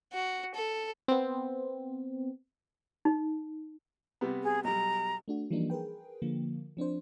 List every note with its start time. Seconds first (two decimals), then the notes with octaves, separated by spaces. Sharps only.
0.13 F#4
0.55 A4
1.08 B3 C4
3.05 D#4
4.21 C3 G3 B3
4.43 G#4
4.64 B1 G3 A#5
5.28 A3 D4 F#4
5.51 E3 F3 G3 A#3 D4 D#4
5.70 G#4 A#4 B4 G5
6.22 D3 F3 A#3
6.77 F3 C4 D4 C5